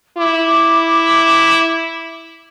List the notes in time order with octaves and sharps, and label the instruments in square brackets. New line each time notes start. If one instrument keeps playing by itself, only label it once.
[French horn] E4 [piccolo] D6